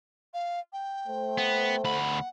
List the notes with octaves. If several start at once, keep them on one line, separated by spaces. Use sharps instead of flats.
F5
G5
A3 C5
B3
D2 F#5 B5